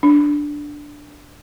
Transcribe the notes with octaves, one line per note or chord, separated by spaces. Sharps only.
D4